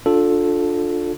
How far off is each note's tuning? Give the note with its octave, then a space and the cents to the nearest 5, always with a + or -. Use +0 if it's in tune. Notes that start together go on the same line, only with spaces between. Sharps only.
D4 +0 F4 +20 A4 +0